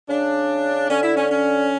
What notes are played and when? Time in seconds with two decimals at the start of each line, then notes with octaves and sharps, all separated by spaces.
0.09 C#3 D4
0.89 D3 C#4
1.02 E4
1.16 C#4
1.30 C#4